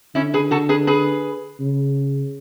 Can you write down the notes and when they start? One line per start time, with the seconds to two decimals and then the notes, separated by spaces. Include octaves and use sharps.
0.15 D3 C#4 E4
0.34 G#4 B4
0.51 F#4 A4
0.69 G#4 B4
0.87 G#4 B4
1.59 C#3